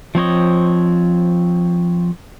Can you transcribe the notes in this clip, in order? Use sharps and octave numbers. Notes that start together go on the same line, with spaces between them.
F3 C4 C#5 D#5